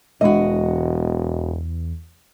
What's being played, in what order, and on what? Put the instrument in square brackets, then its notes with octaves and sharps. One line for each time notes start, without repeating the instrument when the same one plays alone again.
[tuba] E1 [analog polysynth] E2 [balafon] G#3 D4 [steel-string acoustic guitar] F#4 D#5